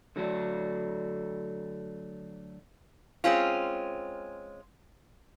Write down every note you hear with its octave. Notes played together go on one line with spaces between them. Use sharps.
D3 F#3 A3 D4
G#3 C4 C#4 F4